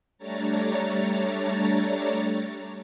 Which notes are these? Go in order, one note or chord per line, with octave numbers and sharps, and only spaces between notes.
G3 A3 D4 C#5 A#5 A6